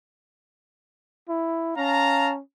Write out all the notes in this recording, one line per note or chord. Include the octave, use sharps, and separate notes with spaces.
E4
C#4 F5 A5 A#5